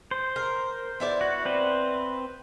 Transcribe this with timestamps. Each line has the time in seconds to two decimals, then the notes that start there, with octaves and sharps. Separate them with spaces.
0.11 C5
0.36 A#4
1.00 B3 E4 D5
1.21 F#4
1.45 C4 B4 C5